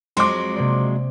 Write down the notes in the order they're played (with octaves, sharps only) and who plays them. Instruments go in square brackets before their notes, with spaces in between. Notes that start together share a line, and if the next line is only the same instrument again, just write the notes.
[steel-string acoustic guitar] F2 F#3 G#3 [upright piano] C6 D6
[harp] C3 A#3 D5